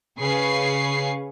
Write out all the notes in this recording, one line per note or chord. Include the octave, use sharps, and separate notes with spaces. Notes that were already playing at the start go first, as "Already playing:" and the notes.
C#3 G#4 B4 F5 C#6 C7